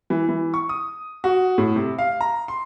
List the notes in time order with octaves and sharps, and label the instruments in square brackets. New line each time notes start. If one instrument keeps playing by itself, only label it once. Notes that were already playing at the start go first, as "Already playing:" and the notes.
[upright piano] E3
E3
C#6
D#6
F#4
A2
C3
F5
A#5
C6